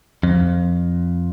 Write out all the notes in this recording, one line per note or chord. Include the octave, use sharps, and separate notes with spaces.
F2